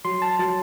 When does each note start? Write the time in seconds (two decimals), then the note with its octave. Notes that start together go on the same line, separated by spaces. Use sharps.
0.05 F#3 C6
0.22 A5
0.39 F#3 A5